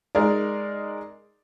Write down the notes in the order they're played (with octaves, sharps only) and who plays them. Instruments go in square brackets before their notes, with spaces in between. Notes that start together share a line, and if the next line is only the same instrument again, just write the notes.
[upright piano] G#3 D#4 G#4 A#4 D5